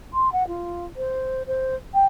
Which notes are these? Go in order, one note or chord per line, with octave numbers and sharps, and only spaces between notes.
C6
F#5
F4
C5
C5
G5